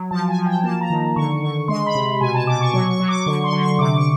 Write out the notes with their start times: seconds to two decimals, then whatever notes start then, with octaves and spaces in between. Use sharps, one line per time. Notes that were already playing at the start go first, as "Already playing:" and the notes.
Already playing: F#3
0.11 F3 A5
0.29 G#5
0.37 F3
0.46 G5
0.64 A#3 A5
0.81 A#5
0.90 D#3
1.16 D3 C#6
1.42 D3 C#6
1.68 G#3 C6
1.86 B5
1.95 C3
2.21 B2 G#5
2.34 A5
2.47 B2 D6
2.61 C#6
2.74 F#3 C#6
2.91 C#6
3.00 F#3
3.09 D6
3.26 D3 C#6
3.44 C6
3.52 D3
3.61 C#6
3.79 C3 D6
3.97 C#6